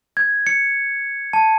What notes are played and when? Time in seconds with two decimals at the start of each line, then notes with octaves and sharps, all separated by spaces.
0.17 G#6
0.47 C#7
1.33 A5